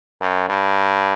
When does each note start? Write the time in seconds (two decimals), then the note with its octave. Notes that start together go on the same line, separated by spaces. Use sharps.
0.21 F#2
0.49 G2